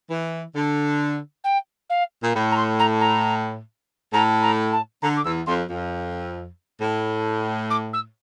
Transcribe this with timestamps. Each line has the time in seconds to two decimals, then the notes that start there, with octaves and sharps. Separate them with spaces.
0.09 E3
0.55 D3
1.44 G5
1.89 F5
2.22 A#2
2.34 A2
2.51 A#5
2.56 C6
2.79 A#5
3.00 A#5
4.13 A2 A#5
4.42 A#5
4.72 A5
5.02 D3 A#5
5.16 D6
5.24 E2 E6
5.46 F2 C6
5.69 F2
6.81 A2
7.70 D6
7.93 E6